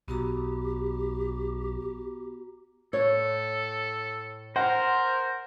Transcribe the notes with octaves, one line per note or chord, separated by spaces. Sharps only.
B1 B3 F#4 G4 A#5
A2 A4 C#5
A#4 C5 F#5